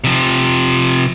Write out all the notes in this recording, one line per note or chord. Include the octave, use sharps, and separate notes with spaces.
C3 F3